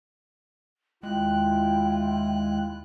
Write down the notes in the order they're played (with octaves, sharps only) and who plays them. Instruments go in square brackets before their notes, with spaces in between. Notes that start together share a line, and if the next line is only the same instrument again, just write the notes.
[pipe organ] D#2 F#6 [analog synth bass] G#3 [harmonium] E4 F4 [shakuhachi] G5